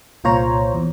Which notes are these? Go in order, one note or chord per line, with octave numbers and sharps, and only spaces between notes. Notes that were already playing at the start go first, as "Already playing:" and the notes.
C2 A#2 F4 C5 C#5 A#5
E2